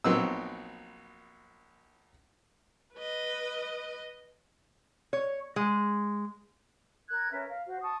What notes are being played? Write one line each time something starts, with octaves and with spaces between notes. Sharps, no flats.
A#1 F#3 B3 C4 D#4 E6
B4 D#5
C#5
G#3
A#4 F#6 G#6
C#4 A#4 B4 E5
F5
F#4 C5
A5 C#6 D#6